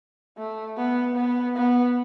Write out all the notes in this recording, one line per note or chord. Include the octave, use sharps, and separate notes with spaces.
A3
B3
B3
B3